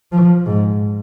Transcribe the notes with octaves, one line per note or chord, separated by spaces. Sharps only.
F3
G#2